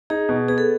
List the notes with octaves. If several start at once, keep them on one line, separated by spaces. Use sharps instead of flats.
D#4 G#4
B2
B3 G#4
A4